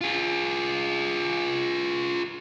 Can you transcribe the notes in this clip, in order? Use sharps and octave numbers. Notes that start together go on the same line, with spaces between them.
F4 G#4